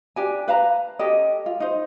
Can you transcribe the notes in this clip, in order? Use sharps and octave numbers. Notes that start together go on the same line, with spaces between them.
D4 G4 G#5
B4 F5 A5 A#5
C#4 G4 A4 D#5
F4
D#4 C5